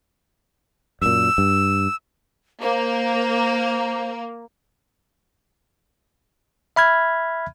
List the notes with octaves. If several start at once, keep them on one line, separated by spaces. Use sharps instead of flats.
F#2 A#2 E6
G2
A#3 C5
E5 B5 F6 G#6